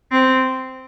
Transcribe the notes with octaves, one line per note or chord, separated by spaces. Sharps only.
C4